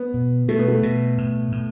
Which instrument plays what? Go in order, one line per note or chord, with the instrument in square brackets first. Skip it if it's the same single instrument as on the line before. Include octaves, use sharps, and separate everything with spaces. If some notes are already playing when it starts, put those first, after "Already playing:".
Already playing: [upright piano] B3
[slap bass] B2
[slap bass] B2 [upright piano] A3
[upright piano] B3
A3
[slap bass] B2
A2
A2